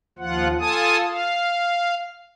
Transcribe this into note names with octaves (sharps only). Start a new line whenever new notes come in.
D#2 F3 F4 F#5
F4 A4 G#5 A5 D#6
F5